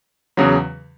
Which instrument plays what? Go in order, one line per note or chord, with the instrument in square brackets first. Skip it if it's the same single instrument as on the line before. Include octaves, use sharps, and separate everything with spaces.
[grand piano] E2 C#3 F#3